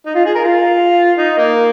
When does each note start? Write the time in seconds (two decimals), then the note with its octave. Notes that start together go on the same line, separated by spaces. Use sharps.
0.06 D#4
0.15 F4
0.25 G#4
0.35 A#4
0.44 F4
1.18 D#4
1.38 A#3